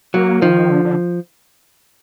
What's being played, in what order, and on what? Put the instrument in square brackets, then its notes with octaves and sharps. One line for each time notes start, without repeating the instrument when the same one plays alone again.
[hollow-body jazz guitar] F#3 [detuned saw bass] A#3
[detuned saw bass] D#3 [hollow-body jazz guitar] F3
[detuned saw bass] D3
D3